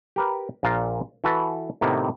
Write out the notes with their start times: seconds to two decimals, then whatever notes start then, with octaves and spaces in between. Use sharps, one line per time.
0.16 G4 A#4 B4
0.63 A#1 A#2 F4 A#4 F5
1.24 E3 F#4 A4 B4
1.81 A2 C3 D#3 A#3 B3